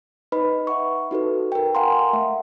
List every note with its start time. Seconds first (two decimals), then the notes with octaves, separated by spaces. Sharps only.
0.32 D#4 B4 D#5 B5
0.67 E5 F#5 C#6
1.11 D#4 F#4 A4 B4
1.52 A#4 G5
1.75 F5 F#5 G#5 A#5 C6
2.13 A3 E5 F#5